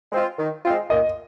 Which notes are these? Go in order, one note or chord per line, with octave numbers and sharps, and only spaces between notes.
G#3 C4 F4
D#3
G#3 C4 F4
A#2 D#5